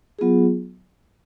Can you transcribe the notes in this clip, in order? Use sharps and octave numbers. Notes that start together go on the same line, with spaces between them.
F#3 B3 F4 G#4